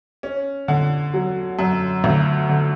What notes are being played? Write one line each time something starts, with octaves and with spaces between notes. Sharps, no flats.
C#4
D3
F#3
F#2
D2
D3